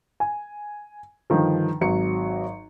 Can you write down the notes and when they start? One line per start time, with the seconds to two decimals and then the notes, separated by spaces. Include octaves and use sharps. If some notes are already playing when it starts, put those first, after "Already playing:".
0.20 G#5
1.30 G2 D3 D#3 F3
1.81 G#1 F#3 C#7